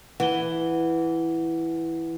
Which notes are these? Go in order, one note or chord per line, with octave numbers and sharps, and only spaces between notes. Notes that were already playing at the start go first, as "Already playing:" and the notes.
E3 F#5 G7